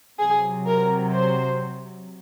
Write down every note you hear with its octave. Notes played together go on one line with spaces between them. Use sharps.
C3 F#3 G#4
A#4
C5